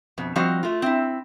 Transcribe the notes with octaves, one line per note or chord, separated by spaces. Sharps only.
F2 B2
F3 G3 C4 F#4 D#5 F5
A3 F4
C4 E4